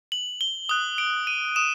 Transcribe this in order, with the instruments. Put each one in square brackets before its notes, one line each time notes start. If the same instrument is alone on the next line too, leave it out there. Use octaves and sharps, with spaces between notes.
[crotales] F#7
G7
D#6 F#6 G7
D7
D#7
D#6 E7